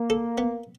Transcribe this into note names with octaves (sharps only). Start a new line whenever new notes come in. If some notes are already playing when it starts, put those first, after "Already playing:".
Already playing: A#3
A4
B3